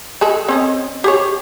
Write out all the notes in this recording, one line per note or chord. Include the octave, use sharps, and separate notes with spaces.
G#3 G#4 A4
C4 C#4 D#5
G4 G#4 C#5